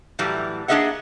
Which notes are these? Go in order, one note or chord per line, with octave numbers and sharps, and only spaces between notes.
A2 E3 F#3 G3
A#3 D4 G#4 D#5 E5 F#5